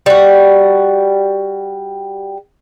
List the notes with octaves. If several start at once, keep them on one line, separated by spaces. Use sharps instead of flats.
G3 F#4